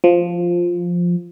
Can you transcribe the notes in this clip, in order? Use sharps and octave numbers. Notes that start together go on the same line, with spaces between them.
F3